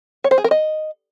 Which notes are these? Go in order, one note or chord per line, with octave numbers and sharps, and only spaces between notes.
C#5
C5
G#4
A#4
D#5